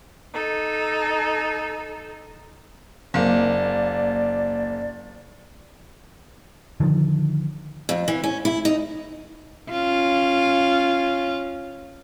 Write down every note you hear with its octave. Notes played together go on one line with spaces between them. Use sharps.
D#4 A4
F#1 A#3 D5
D3 D#3 F3
F2
E3
C#4
E4
D#4
C#4 F4